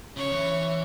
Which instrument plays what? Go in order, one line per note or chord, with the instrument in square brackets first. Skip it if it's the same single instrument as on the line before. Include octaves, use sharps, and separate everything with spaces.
[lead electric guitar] C#3 [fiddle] C#5
[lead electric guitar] E3